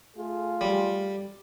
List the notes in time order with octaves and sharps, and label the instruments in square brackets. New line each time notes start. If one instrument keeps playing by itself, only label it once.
[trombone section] A3 F4 G#4
[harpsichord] G3